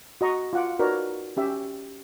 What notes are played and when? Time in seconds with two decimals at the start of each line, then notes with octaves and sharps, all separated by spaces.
0.21 F#4 D#5 A#5 C#6
0.53 F4 F#5 D6
0.79 D#4 F#4 A#4 B4 C#5 D5
1.37 C#4 G4 E5